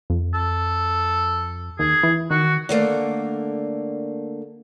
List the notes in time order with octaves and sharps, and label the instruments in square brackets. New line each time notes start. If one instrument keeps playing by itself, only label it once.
[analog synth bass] F2
[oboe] A4
[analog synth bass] D#2 [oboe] G#4
[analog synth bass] E3
[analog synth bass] D#3 [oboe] F#4
[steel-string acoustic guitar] D3 A3 A#3